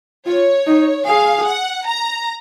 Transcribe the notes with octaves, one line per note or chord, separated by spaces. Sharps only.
F4 C#5
D#4
G#4 F5
F#5
A#5